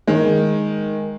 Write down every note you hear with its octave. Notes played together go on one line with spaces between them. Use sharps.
D#3 G#3